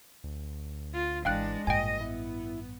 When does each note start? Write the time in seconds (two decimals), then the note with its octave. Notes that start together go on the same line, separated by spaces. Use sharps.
0.24 D2
0.94 F4
1.25 G#1 E3 G#3 D4 F5 G5 F#6
1.67 A1 G2 A#2 D#5 G5 G#5
2.01 B3 E4